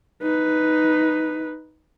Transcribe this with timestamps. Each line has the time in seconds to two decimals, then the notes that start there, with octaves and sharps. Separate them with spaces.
0.22 D#4 B4